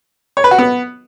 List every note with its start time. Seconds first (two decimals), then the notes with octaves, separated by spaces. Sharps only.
0.37 C#5
0.44 B4
0.51 F#4
0.58 B3